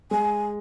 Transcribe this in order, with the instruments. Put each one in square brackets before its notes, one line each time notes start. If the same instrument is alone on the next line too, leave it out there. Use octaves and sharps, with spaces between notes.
[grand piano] G#3 [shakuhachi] G#5